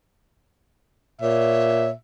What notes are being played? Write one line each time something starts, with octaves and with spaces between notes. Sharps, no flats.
A#2 C#5 E5